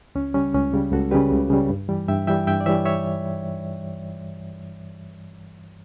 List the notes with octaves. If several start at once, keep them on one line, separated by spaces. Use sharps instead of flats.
C#2 C#4
C#3 G3 C#4
C#2 C#4
C#3 G3
C#2 F#4 A4
C#3 G3 G4 B4
C#2
C#3 G3
G2
E3 G3
G2 E5 G5
E3 G3 E5 G5
G2 E5 G5
D5
E3 G3 C#5 E5
C#5 E5